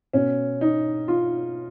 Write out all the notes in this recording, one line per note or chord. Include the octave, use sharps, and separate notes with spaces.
B2 C#4
D#4
F4